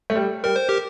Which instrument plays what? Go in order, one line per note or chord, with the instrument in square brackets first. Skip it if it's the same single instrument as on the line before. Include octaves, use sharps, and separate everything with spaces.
[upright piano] A3
G3
[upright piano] G3 [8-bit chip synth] A#4
[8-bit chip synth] C5
G4 A#4